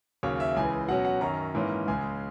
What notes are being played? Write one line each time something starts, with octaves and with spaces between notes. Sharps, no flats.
D#2 C#3 F#3 C#5
E5
C#2 C#3 E3 G#5
B2 F#3 C#4 F#5
F#5
F#2 D#3 F#3 C#4 A#5
G#2 E3 A#3 C#4
C#2 C#3 G#3 G#5